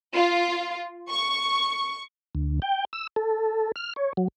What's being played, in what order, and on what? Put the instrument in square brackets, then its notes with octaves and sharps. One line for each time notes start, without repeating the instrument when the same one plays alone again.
[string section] F4
C#6
[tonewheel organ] D2
G5
E6
A4
F6
C#5
F#3